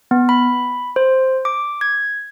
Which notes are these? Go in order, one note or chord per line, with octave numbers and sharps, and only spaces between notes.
B3
B5
C5
D6
G#6